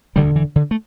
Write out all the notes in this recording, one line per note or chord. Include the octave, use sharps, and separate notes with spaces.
E1 D2 D3 G3
E3
D3
A3